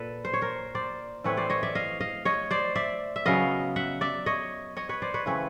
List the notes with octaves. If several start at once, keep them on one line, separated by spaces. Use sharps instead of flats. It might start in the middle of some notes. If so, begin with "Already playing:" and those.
Already playing: A#2 A4 B4
C5
C#5
A#4 C5
C5 D5
A2 E3 A3 C4 B4 C#5
C5 D5
C#5 D#5
D5 E5
D#5 F5
D#5 F5
C#5 D#5
C5 D5
D5 E5
E5
C#3 F#3 B3 D#5 F5
E5 F#5
D5 E5
C#5 D#5
C#5 D#5
B4 C#5
C5 D5
B4 C#5
C#3 E3 A3 C4 B4 C#5